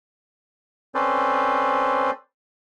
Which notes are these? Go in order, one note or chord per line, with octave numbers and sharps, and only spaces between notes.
C4 C#4 A4 B4 C5 D5